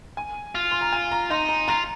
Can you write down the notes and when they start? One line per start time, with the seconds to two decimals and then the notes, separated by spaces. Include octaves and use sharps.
0.17 G#5
0.55 F4
0.71 C6
0.81 A#5
0.93 G#5
1.12 A#5
1.30 D#4 C6
1.49 A#5
1.68 F4 A#5